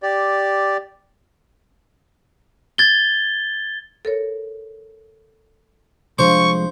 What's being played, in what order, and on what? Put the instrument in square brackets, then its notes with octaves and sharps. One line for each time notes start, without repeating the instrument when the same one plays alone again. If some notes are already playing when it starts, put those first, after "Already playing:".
[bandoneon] G4 D5
[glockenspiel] G#6 A6 G7
[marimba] A4 A#4 C#5
[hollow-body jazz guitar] C2 F3 G#3 [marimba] D4 F5 [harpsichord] C5 [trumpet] C#6